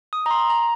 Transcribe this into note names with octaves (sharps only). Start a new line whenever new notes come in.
D#6
A#5
C6
A#5